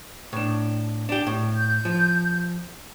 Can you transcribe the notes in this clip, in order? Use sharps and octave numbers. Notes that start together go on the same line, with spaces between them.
A2 D4
D4 G4
A2
G6
F3